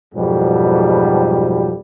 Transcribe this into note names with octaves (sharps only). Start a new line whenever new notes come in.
F2 G#2 B2 F#3 G3